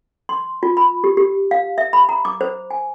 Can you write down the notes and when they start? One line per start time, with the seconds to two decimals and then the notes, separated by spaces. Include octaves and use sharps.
0.29 C6
0.63 F4
0.77 B5
1.04 G4
1.17 G4
1.51 F5
1.78 E5
1.93 B5
2.09 A#5
2.25 D6
2.41 C5
2.71 G#5